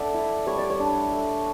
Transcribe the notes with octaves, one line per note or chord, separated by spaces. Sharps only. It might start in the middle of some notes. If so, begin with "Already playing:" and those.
Already playing: A3 D4 D5 E5 F#5
E4
G3 C#5
D5
C#5
D4
A3